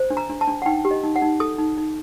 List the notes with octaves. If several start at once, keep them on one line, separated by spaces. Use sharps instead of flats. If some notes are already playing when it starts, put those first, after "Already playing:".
Already playing: C5
D4
A#5
D4
A5
D4
F#5
D#4 G5
G4
D#5
D#4
F#5
D#4
A4 D#6
D#4
D#4